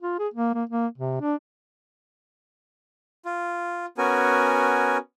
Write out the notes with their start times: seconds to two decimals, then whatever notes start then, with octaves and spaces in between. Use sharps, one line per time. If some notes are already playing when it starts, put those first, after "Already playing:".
0.02 F4
0.19 G#4
0.34 A#3
0.54 A#3
0.69 A#3
0.98 C3
1.21 D4
3.25 F4
3.98 B3 C#4 F#4 A#4 G#5